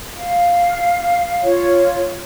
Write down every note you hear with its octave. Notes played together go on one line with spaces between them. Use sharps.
F5
F4 C#5